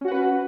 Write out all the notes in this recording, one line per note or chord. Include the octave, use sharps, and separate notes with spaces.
C#4 F#4 B4 F#5